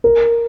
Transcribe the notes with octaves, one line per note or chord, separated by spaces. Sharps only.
A#4